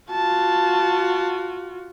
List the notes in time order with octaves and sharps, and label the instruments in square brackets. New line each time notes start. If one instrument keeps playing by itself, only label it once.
[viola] F4 F#4 [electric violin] A5